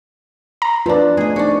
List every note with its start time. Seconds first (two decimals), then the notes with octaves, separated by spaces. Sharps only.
0.62 A#5
0.86 F3 D4 F4 B4 D5
1.17 A3 D4 G#4 D#5
1.36 D4 D#4 F4 F#4 C5